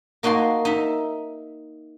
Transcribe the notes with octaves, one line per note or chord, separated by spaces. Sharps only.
A#3 D#4 F#4 A5 C6
D#4 E5